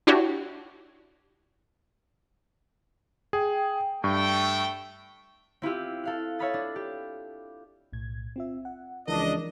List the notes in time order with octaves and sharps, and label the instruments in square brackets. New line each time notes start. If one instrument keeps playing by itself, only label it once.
[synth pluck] D4 E4 F#4 G4 C#5
[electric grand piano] G#4 [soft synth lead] G5
[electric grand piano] G2 [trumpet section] A3 G5 [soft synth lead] C#6
[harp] C4 E4 F4 G4
A4 F5 F#6
C#5 E5 F5 B5 D#6 A6
D4
G4
[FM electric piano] B1 A2 G#6
C4 F4 E5
F#5
[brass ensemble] C#2 D4 D#5 [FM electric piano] E3 F3 A#4